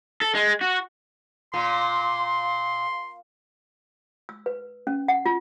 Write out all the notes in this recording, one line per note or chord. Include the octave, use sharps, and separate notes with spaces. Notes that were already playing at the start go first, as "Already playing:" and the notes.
A4
G#3
F#4
A#2 C6
E6
B4
C#4
F#5
F4